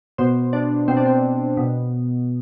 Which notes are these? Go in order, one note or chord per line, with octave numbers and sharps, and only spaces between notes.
B2 C5
D4
B2 C4
D4
C4
B2